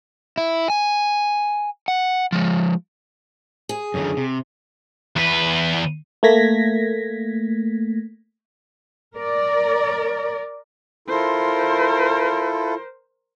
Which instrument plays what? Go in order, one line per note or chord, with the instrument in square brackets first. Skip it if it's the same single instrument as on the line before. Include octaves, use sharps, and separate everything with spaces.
[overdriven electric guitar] E4
G#5
F#5
F3 G#3
[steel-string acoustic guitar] G#4
[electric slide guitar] F#2 D3 D#3
C3
[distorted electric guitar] E2 B4
[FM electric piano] A3 A#3 G#6 A#6 B6
[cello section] A#4 D5
[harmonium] E4 F4 A4 [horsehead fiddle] A#4 C5